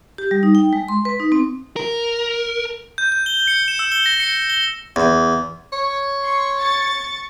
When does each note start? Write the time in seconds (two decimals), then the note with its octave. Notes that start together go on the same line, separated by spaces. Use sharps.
0.18 G4
0.31 G3
0.43 D#4
0.55 G5
0.73 G#3
0.88 C6
1.05 B4
1.20 D#4
1.32 C4
1.76 A#4
2.98 G6
3.12 G6
3.26 G7
3.48 C#7
3.68 E7
3.79 E6
3.92 G7
4.06 A#6
4.20 C#7
4.50 G7
4.96 E2
5.73 C#5
6.21 C6 C#6
6.57 C#6 A6